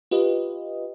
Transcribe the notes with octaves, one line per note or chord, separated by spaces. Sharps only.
F4 G4 B4 D#5